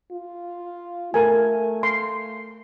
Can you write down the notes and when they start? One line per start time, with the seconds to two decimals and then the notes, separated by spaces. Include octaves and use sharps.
0.12 F4
1.14 A3 A4 A#4 G#5
1.83 C6